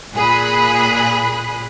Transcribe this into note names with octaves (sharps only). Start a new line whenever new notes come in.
A#2 G#4 B5 F#6